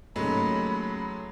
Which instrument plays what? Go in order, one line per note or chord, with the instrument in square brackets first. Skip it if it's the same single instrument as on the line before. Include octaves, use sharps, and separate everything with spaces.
[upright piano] D#2 C#3 [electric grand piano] F#3 G#3 A3 [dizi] B5